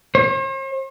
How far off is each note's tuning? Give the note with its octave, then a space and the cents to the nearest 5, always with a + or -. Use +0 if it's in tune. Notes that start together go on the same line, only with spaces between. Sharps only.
C5 +45